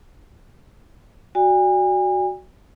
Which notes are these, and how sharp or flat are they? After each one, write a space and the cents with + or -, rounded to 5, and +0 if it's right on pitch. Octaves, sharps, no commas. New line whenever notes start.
F#4 +0 D5 +0 G#5 -40